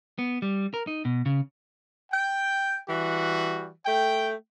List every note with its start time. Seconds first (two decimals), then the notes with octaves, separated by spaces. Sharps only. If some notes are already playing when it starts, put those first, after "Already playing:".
0.19 B3
0.42 G3
0.74 A#4
0.87 D#4
1.05 B2
1.26 C#3
2.12 G5
2.89 E3 G3 F#4
3.86 A3 G5